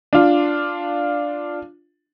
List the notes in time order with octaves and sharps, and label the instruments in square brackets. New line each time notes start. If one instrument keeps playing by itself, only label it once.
[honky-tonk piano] D4 F4